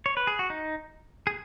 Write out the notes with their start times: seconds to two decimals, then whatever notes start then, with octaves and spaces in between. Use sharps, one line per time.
0.06 C#5
0.17 B4
0.27 G#4
0.39 F#4
0.50 D#4
1.27 G#4